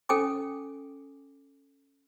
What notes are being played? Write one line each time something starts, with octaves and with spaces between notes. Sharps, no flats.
C#4 A4 G5 G#5 D6